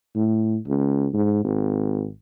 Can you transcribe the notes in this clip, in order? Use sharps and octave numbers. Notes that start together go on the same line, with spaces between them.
A2
C#2
G#2
G#1